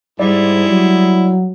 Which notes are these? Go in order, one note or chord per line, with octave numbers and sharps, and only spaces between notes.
G#2 G3 G#3 E4 D5
F#3